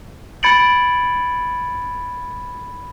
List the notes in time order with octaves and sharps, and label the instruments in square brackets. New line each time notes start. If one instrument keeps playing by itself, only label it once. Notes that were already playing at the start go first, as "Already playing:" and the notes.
[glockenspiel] B5 G#6 A6 C#7 D7 F#7